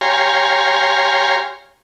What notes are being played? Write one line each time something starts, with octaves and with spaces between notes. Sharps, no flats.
G4 C#5 F5 G#5 A#5 C6